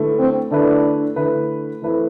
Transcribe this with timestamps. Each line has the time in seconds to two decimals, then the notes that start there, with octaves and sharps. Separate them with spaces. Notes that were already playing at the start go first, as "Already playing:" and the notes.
Already playing: D3 A3 E4 B4
0.18 C4
0.51 D3 A3 D4 E4 B4
1.16 D3 A3 E4 B4
1.82 E3 A3 C4 E4 B4